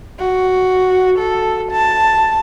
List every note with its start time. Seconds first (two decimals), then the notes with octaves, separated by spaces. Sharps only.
0.20 F#4
1.19 A4
1.72 A5